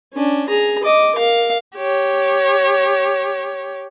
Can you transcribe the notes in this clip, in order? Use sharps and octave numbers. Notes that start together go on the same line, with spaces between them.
C#4 D4
G#4 A#5
D#5 D6
A#4 F5
G4 C#5